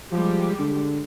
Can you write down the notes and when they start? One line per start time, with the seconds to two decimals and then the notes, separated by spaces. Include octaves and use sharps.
0.12 F3 G3 G#3 G4
0.59 D3